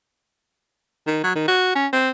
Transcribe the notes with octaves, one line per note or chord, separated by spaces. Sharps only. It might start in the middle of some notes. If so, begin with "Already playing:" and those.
D#3
F#3
D#3
F#4
C#4
C4